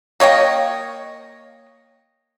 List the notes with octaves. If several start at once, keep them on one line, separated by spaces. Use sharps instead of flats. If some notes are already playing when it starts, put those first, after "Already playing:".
A#3 C#5 D#5 G5